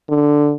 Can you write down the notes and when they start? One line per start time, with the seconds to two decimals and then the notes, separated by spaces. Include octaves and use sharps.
0.09 D3